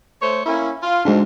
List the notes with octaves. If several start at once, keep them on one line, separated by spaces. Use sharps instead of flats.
A3 C5 C#5
A#3 C#4 E4
F4
D2 G#2 G#3 D4